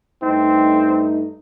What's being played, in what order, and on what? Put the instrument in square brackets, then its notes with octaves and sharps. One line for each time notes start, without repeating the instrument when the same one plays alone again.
[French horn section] G2 A3 D#4 [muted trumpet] C4